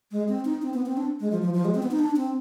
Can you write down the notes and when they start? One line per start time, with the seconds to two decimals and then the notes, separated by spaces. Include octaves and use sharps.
0.12 G#3
0.29 C4
0.45 D#4
0.62 C4
0.74 B3
0.86 C4
0.97 D4
1.20 G#3
1.31 F3
1.42 F3
1.54 F3
1.65 G#3
1.75 C4
1.83 B3
1.91 D#4
1.99 D4
2.16 C4